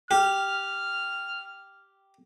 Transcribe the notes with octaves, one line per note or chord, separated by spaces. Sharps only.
G4 F6